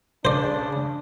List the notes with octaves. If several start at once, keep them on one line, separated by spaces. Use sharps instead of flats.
C#3 D4 C5 D5